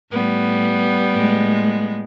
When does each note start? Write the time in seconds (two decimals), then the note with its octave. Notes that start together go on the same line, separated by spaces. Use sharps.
0.12 A2 G3 B3
1.13 A2 G#3